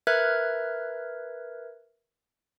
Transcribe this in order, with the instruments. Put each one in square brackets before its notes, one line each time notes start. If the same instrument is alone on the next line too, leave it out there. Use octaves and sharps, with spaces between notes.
[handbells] A#4 B4 E5 F6 F#6 G#6